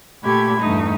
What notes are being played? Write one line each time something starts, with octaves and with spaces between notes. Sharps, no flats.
A#2 A3 G4 B5 G#6
E2 G2 A3 D#4